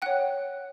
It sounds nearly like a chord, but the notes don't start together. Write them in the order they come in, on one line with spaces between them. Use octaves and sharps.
F#5 G5 F#6 C#5